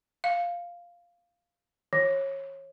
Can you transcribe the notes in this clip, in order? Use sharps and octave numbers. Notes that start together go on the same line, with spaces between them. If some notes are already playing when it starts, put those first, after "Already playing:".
F5
E3